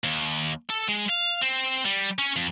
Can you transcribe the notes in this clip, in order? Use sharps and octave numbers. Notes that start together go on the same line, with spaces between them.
D#2
A4
G#3
F5
C4
G3
C#4
F2